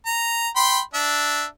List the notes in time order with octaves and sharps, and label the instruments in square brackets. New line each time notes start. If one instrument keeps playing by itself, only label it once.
[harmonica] A#5
G5 B5 C6
D4 E5